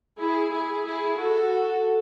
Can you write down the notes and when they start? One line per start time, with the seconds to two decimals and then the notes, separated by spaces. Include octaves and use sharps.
0.19 E4 G#4
0.52 E4 G#4
0.86 E4 G#4
1.19 F#4 A4